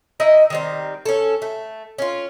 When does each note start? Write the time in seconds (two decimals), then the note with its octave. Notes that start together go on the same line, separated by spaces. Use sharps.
0.20 D#4 E4 D#5
0.50 D#3 G3 C4
1.06 C#4 A4
1.42 A3
1.98 C#4 F4